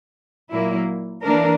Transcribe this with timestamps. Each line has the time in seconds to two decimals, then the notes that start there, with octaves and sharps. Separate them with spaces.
0.50 A#2 F#3 A#3 E4
1.22 E3 A#3 D4 A#4